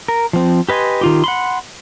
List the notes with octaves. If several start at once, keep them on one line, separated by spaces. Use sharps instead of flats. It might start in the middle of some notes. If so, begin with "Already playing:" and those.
A#4
F3 C4
G4 B4 D#5 G#5 C6
D#3 F4 G4
F#5 B5 C6